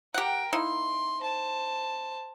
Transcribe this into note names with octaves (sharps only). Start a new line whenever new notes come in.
G4 A#4 F#5 G5
A#3 D#4 E4 C6
C5 A5